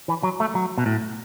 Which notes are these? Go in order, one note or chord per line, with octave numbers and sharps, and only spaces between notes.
E3
F#3
A3
F#3
B2
A2